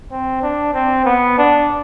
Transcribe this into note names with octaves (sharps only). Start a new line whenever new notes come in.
C4
D4
C4
B3
D4